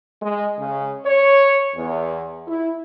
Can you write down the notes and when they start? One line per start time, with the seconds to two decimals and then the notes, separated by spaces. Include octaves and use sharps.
0.22 G#3
0.58 C#3
1.06 C#5
1.75 E2
2.47 E4